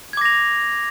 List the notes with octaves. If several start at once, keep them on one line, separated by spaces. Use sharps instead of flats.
D6 G#6 A#6 F7